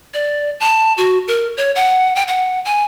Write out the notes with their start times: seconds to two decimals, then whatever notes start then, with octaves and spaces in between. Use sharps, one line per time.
0.14 D5
0.60 A5
0.98 F#4
1.28 A#4
1.57 C#5
1.76 F#5
2.16 G5
2.28 F#5
2.65 G#5